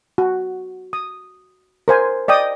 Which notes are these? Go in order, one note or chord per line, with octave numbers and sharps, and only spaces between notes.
F#4
D#6
A#4 C5 G#5
D5 D#5 G5 D#6